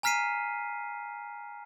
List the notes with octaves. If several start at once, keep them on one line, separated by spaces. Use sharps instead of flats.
G#5 A#5 F6 B6 C7 D#7